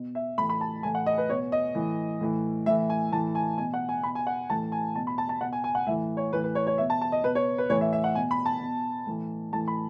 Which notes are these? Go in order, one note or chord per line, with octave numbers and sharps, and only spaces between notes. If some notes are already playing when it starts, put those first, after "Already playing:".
Already playing: B2
E5
A2 E3 B5
B5
A5
A2 E3 G#5
F#5
D#5
B4
B2 C#5
D#5
A2 E3
A2 E3
A2 E3 E5
G#5
A2 E3 A5
G#5
B2 G#5
F#5
G#5
B2 B5
G#5
F#5
A2 E3 A5
G#5
B2 A5
B5
A5
A5
B2 F#5
G#5
G#5
F#5
A2 E3 E5
C#5
A2 E3 B4
B4
C#5
C#5
B2 E5
A5
A5
D#5
B2 B4
C#5
B4
A2 E3 C#5
E5
E5
F#5
B2 G#5
B5
A5
B2
A2 E3
A2 E3 A5
B5